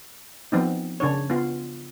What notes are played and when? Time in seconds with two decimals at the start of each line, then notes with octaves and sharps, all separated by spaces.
0.52 F3 B3 C4 D#4
1.00 C#3 D4 C#5
1.30 B3 F4